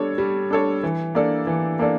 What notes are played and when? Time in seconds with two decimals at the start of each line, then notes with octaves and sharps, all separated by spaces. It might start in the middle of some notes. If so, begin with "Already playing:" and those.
Already playing: G3 D4 A4 C#5
0.18 G3
0.50 D4 A4 C#5
0.83 E3
1.15 A#3 D4 A4 D5
1.47 E3
1.79 A#3 D4 A4 D5